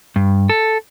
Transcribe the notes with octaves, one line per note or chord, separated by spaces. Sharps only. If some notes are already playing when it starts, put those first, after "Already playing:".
G2
A4